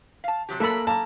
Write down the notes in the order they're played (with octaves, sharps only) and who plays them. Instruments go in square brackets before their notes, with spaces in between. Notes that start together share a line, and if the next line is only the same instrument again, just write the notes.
[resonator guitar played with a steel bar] F5 A5
C3 F#3 G4
[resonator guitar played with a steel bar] F#3 E5 [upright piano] A#3 A#5 [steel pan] A4 B5
[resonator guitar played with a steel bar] A#3 [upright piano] A5 A#5